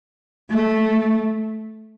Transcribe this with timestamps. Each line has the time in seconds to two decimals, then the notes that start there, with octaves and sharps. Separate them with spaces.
0.51 A3